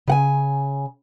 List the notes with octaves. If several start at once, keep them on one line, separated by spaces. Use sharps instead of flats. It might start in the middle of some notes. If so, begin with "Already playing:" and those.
C#3 F#5 G#5